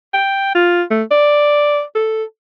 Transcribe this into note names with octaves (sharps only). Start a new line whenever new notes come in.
G5
F4
A3
D5
A4